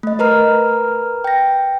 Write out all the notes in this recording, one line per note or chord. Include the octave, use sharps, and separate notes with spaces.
A3 D#5
A#4 B4 A#5 F6
G5 A#6